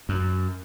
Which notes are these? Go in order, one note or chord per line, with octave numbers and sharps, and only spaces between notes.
F#2